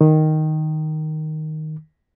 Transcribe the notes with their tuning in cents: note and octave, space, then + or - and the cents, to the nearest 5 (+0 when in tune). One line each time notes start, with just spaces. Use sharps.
D#3 -5